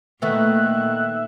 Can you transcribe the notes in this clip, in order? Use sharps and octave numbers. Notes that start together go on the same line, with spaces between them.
A#2 D#3 A3 B3 E5 F#6